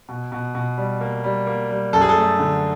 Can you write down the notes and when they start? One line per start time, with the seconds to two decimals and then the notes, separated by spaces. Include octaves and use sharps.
0.09 B2
0.32 B2
0.55 B2
0.78 G3
1.01 A#3
1.24 G3
1.47 A#3
1.71 G3
1.93 F#2 A4
2.01 G#4
2.09 A4
2.16 A3
2.39 D3